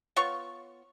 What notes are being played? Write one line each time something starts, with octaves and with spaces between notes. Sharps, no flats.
B3 F4 C#5 C#6